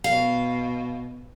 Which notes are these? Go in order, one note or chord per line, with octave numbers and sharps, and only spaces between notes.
B2 F5